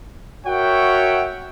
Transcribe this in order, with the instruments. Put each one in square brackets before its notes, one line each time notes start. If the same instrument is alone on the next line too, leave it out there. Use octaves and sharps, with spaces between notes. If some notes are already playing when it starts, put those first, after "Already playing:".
[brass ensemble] F#4 A#4 C#5 E5 F#5 G5